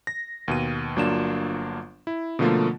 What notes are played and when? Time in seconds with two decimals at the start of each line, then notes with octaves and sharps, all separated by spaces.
0.07 A#6
0.48 D#2 B2 D#7
0.96 G1 F#3 A#3 D4 F4 E7
2.07 E4
2.39 B2 D3 F3 A3 A#3 F4